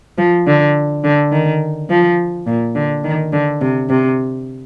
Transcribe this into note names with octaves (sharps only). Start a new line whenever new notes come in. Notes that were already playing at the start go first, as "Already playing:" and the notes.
F3
D3
D3
D#3
F3
A#2
D3
D#3
D3
C3
C3